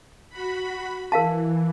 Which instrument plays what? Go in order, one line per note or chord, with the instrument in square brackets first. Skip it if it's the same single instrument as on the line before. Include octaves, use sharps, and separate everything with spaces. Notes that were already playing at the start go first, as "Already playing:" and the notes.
[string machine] F#4 B5
[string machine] E3 [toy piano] A#4 F5 A5